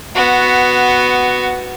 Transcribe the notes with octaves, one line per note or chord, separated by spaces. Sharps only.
B3 F#4